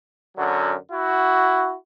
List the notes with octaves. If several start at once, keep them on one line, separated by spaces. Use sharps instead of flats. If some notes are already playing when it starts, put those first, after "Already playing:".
F#2 D3 F#3
E4 F#4